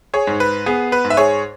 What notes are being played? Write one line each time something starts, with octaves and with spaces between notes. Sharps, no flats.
G#4 C#5
G#2
B4
B3 G#4
B4
G#2
E5
G#4 C#5